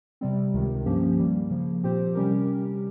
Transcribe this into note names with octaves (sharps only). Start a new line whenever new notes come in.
C3 G3 C4
C#2 C3 D#3
G2 F3 A#3 C#4 G4
D#3 G3 A#3
C#3 F3 A#3
A#2 F3 C4 G4 C5
C3 G3 C#4 G4 A#4